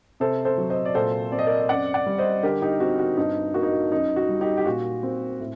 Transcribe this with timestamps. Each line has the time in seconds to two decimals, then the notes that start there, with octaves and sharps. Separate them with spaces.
0.20 C3 A4 C5
0.45 A4 C5
0.58 F#3
0.70 C5 D#5
0.85 D5
0.95 A#2 A4 C5
1.32 C4 D5
1.39 D#5
1.46 A#4 D5
1.60 D#5
1.69 F#2 D5 F#5
1.94 D5 F#5
2.06 G3
2.18 C5 D#5
2.43 D3 G4 A#4
2.62 D#4 G4
2.80 C4 F#4
2.99 F#4
3.17 G2 D#4
3.54 A#3 F#4
3.63 D#4
3.72 F#4
3.92 F#2 D#4
4.16 F#4
4.29 G3
4.41 D#4 G4
4.57 G4
4.66 A#2 F#4
5.03 C4
5.40 A2